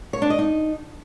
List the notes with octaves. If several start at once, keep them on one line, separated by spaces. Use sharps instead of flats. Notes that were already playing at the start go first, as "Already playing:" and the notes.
C#5
D4
D#5
D#4